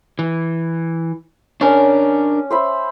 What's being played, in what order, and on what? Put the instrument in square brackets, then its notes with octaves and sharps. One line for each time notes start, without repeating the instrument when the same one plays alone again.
[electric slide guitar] E3
[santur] C#4 [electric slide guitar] D4 A#4
[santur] C5 E5 B5